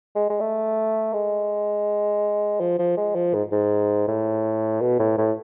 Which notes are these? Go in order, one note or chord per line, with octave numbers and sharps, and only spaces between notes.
G#3
G#3
A3
G#3
F3
F3
G#3
F3
G#2
G#2
A2
B2
A2
A2